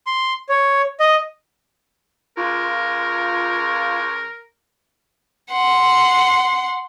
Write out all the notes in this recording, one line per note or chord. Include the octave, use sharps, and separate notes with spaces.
C6
C#5
D#5
C#2 F4 A#4
F#5 C6